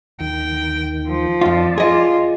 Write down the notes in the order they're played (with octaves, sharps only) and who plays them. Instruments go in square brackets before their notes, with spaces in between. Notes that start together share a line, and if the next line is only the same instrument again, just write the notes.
[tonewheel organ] D#2 D#3 [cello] G5
[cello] F3
[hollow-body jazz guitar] F2 F4 [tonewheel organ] D5 A5
[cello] F4 [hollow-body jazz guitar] G#4 D#5